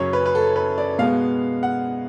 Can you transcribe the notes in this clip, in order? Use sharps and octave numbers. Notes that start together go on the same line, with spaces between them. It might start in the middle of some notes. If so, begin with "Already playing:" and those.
Already playing: F#2 C#3 F#3 C#4 C#5
B4
B4
A4
B4
D5
B2 G#3 B3 F5
F#5